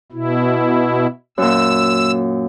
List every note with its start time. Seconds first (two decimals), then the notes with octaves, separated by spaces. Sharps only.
0.12 B2 E4
1.38 F#2 A#2 E6